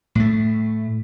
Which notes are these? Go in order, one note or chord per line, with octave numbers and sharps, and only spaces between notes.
A2 A3